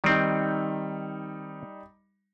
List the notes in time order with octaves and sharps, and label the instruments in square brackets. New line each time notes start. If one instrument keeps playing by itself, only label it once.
[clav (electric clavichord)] D#3 C4 [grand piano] G3 D#4